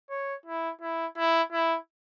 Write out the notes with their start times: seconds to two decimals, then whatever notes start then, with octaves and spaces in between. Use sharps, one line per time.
0.10 C#5
0.46 E4
0.81 E4
1.17 E4
1.52 E4